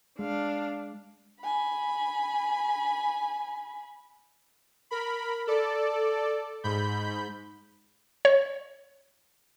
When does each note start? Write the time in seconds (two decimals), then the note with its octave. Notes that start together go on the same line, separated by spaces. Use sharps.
0.19 G#3 D4 F5
1.41 G#5 B5
4.91 A#4 B5
5.47 A4 D5
6.64 G#2 B5 G6
8.25 C#5